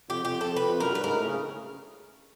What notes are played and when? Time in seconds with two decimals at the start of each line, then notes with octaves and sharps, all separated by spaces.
0.09 F2 G4
0.25 F2 G4
0.41 F2 A4
0.56 B4
0.69 F2
0.80 F#2 A#4
0.92 G2 B4
1.04 G#2 A#4
1.16 A2
1.28 C#3